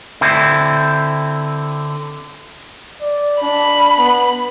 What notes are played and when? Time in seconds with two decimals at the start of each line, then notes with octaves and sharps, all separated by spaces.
0.21 D3 C4 E4
3.02 D5
3.42 D4 B5
3.98 B3